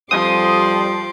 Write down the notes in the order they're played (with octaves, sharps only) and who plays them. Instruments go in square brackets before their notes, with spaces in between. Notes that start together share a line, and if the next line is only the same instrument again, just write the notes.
[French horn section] F2 G3 [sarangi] F3 [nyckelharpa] C6 D6 [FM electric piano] D#6